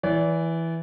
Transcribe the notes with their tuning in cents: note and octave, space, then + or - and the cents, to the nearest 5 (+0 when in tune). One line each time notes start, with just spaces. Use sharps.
E3 +0 D5 -30